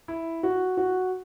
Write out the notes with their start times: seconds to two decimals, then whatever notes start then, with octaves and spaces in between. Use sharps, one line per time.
0.08 E4
0.43 F#4
0.77 F#4